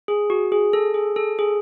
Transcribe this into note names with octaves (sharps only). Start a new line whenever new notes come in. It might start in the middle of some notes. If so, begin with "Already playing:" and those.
G#4
F#4
G#4
A4
G#4
A4
G#4